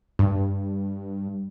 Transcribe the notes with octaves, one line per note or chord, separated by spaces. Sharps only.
G2